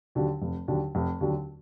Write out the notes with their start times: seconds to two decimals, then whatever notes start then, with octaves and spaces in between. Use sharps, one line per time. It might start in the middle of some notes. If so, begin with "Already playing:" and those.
0.15 D#2 D3 F#3
0.42 F1
0.68 D#2 D3 F#3
0.95 F1
1.20 D#2 D3 F#3